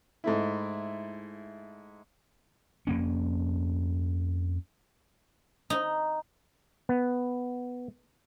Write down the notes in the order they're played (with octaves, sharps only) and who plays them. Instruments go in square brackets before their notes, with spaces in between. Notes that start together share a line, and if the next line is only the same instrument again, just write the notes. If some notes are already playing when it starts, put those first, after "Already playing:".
[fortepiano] G#2 A3 E4
[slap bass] F2 A#3 C#4
[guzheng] D#4
[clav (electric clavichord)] B3